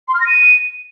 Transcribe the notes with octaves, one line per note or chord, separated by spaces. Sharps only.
C6
F6
A#6
D#7